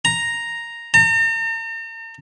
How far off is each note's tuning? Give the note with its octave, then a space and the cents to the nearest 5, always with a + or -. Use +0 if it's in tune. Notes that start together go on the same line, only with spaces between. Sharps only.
A#5 +0
A#5 -45